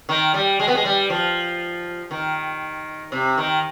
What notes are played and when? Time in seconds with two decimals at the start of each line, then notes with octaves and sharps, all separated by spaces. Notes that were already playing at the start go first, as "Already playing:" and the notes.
0.09 D#3
0.34 G3
0.60 G#3
0.68 B3
0.75 G#3
0.85 G3
1.10 F3
2.11 D#3
3.12 C3
3.38 D#3